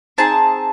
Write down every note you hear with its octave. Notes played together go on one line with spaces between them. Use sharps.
C4 D#4 G#4 A5